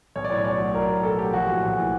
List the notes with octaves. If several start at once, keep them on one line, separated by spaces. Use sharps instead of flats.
B1 C#5
D5
A2 C#5
B1 D5
F#3
B1 A#4
A2
B1 A4
F#3 G4
A#1 F#4
A2
A#1
E3